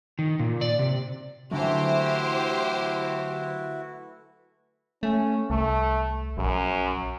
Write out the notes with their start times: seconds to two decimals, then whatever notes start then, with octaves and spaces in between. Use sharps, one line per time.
0.19 D#3
0.39 A#2
0.61 D5
0.79 C3
1.51 D3 E3 F#3 A3 E4 F#4 G4 C5
5.03 A3 C#4
5.50 C2 A3
6.37 A#1 F#2